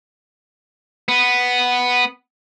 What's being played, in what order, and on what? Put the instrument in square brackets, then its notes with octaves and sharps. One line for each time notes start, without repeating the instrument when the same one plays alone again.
[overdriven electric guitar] B3